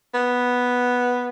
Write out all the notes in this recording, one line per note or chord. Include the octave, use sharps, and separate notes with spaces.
B3